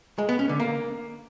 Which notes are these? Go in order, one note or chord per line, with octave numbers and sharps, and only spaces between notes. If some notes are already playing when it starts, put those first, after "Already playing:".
G#3
B3
C#4
D3
A#3